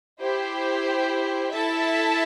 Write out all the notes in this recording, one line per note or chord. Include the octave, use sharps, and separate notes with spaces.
E4 G4 C5
E4 A4 E5 A5